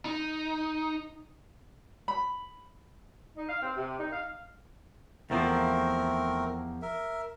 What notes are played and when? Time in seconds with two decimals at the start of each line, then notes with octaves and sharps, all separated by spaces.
0.05 D#4
2.08 B5
3.36 D#4
3.49 F5
3.62 C4
3.76 C3
3.99 D#4
4.12 F5
5.30 E2 F3 A3 A#3 C4 A#4
6.82 A#4 E5